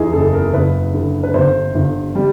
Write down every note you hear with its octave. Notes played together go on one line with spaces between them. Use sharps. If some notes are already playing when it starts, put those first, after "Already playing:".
Already playing: E2 D#4 G#4
F#1 A4
A#4
F#1 B4
D3
B4
G1 C5
G1
G3